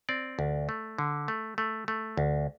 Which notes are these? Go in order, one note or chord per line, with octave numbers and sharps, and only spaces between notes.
C4 D5
D2
A3
D3
A3
A3
A3
D2